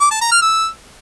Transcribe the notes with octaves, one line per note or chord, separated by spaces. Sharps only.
D6
A5
A#5
F6
E6